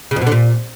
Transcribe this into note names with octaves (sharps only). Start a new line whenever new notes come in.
C#3
F2
B2
D3
A#2